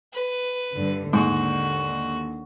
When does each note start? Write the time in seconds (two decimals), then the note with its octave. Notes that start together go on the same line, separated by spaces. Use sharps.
0.13 B4
0.74 G2 D3
1.13 D#2 G#2 D3 F#4